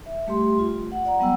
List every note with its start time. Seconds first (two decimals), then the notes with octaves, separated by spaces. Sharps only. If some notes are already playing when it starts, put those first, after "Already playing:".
0.06 E5
0.27 G3 A3 G4 C6
0.59 F4
0.92 F#5
1.05 D5 F#5 A#5
1.19 F#3 G3 B3 F#5 G5 E6